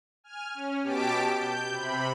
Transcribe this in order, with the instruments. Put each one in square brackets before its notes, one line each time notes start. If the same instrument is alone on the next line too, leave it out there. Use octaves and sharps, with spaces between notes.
[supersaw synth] G#5 F6
C#4
B2 G4 A5 B6 D7
G6
C3 B5